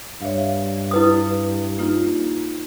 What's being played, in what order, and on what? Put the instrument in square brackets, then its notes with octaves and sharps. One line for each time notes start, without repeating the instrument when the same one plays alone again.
[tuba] G2 [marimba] C#5 E5 F5
[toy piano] E4 B4 D#6
[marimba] A#3 D#4 F4